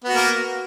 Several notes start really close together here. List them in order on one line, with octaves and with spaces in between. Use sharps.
B3 F#4 A#3